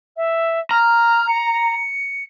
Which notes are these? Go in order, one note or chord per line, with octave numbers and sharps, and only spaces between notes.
E5
A#5 F6
C#7